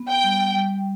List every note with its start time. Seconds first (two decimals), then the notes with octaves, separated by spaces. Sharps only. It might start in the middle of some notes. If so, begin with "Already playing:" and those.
Already playing: B3
0.09 G5
0.24 G3
0.54 G3